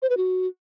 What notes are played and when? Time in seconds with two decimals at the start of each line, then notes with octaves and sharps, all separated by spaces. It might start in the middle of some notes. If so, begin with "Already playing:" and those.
0.02 C5
0.10 B4
0.17 F#4